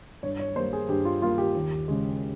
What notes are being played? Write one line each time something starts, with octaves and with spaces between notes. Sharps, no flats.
G2 C#5
C#5
G3 A#3 C5
G#4
G2 G4
F4
G3 A#3 F4
G4
D#2
C#3 G#3